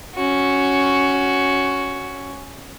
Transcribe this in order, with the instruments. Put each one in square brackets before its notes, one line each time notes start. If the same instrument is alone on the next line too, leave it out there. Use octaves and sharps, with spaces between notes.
[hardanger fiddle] C#4 F#4